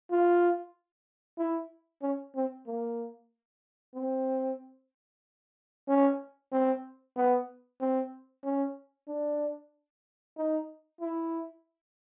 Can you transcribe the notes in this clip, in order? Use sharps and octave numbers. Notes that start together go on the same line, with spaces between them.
F4
E4
C#4
C4
A#3
C4
C#4
C4
B3
C4
C#4
D4
D#4
E4